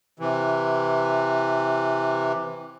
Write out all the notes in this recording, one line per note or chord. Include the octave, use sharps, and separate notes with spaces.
C3 E3